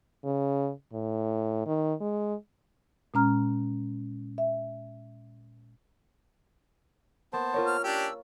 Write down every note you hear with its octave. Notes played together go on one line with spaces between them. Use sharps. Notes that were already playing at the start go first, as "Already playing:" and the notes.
C#3
A2
D#3
G#3
A#2 G#3 C#4 A#5 F6
E5
A#3 B3 C5 A5
F4 A#4 C#5
F6
C#4 D4 G4 E6